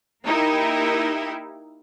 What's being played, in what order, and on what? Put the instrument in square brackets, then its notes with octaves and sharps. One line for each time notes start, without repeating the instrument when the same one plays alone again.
[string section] A#3 D#4 E4 G4 A#4